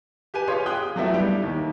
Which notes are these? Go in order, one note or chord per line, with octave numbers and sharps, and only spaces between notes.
G4 B4 G#5 D#7
F4 G4 G#4 C#5 C6
G#4 G5 D#6 F#6
F#3 A3 B3 E4 E5
G2 G3 G4 D7
D#2